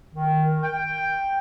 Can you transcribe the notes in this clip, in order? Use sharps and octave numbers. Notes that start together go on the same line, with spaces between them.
D#3
G5